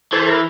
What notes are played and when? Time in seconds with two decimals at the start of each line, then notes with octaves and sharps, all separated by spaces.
0.12 E3 A4 C5
0.22 A4
0.29 A#4